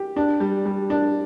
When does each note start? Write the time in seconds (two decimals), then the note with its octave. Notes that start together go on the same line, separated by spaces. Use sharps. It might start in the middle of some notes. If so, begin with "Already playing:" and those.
Already playing: G4
0.16 D4
0.40 G3
0.66 G3
0.90 D4